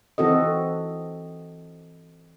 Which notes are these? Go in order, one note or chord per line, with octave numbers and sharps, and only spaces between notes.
E3 C4 F#4 A4 D#5